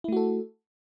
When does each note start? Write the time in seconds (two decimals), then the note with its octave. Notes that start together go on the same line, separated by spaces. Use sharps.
0.04 E4
0.08 A3
0.12 F#4
0.17 A4